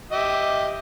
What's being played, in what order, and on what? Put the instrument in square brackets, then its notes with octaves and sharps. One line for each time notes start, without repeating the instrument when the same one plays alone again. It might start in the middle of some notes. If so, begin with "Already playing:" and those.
[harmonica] G4 D#5 E5